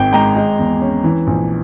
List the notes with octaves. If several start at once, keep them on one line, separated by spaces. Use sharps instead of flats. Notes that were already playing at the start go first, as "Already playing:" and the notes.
Already playing: G#1 D#3 G5
G#3 G5 A#5
G#3
E2
C#4
E3
A#1